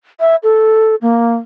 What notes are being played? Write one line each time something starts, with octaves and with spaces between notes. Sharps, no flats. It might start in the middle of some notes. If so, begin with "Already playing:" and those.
E5
A4
A#3